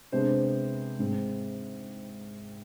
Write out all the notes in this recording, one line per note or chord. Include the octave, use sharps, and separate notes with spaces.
C3 G#3 B3 D4 C5
G#2 G#3 C4